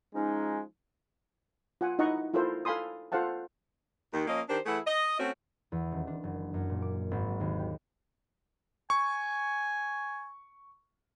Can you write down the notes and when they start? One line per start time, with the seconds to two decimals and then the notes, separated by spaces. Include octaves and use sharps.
0.15 F3 G#3 C#4 D#4
1.81 F4 F#5 G#5
1.99 D#4 E4 D#5 F#5 A#5 C#6
2.34 E4 F4 A4 A#4 C5
2.65 A4 F5 G#5 B5 C6 D#6
3.12 F4 A4 C5 F5 F#5 A5
4.13 D#2 D#3
4.27 F3 A#3 C#4 F4 D#5
4.49 D#3 D4 G4 A#4 C5
4.66 E3 A3 E4 G#4 F#5
4.87 D#5
5.20 A3 C4 C#4 F#4
5.72 E2
5.92 D#1
6.07 D4
6.24 F#1
6.54 F#2
6.70 A#2
6.82 D6
7.11 G#1
7.27 F#3
7.40 D#2
7.59 G4
8.90 G#5 C#6